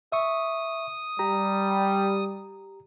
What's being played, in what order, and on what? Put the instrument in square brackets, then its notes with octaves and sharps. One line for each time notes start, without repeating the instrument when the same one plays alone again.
[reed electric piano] E5 C#6 [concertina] D#6
[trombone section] G3 [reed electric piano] G4 A#5